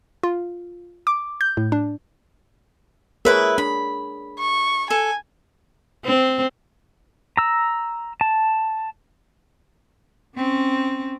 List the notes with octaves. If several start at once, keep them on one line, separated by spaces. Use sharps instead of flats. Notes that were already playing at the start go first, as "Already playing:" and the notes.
F4
D6
G6
A2
D4
E4 G#4 A#4 B4 C#5 E5
D4 B5
C#6
A4 G#5
C4
A#5 E6
A5
C4 C#4